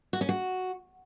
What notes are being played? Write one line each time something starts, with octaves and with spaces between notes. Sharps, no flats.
F#4
C#4
F#4